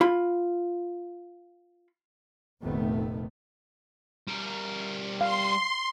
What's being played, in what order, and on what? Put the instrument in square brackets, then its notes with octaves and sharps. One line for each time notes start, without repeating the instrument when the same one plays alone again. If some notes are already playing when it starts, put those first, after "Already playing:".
[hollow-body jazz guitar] F4 B5
[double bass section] F1 A#1 C3 D#3 A3 B3
[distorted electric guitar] G3 A#4
[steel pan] F5 [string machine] C6